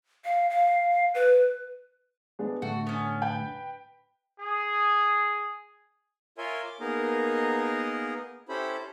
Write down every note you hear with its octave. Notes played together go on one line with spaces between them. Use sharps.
F5
F5
B4
G#3 B3 D4
A2 D3 A3 F#4
B3 C#4
B4 G5
G#4
F4 A#4 C#5 E5 G#5 C6
D6
A#3 B3 D#4 G#4 A#4 D#5
C#4 E4 G4 A4 C5 B5